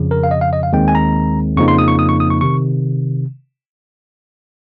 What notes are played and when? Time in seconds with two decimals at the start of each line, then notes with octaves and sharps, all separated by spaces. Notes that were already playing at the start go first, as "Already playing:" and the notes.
Already playing: F2 C#3 F3
0.11 A#4
0.24 F5
0.31 D#5
0.41 F5
0.53 D#5
0.63 F5
0.73 D#2 D#3 G#3 C4 G5
0.88 G#5
0.95 A#5
1.57 F2 C#3 F3 A#3 D#4 C#6
1.68 C6
1.78 D#6
1.88 C#6
1.99 D#6
2.09 C#6
2.20 D#6
2.30 C#6
2.41 C3 D#3 C#6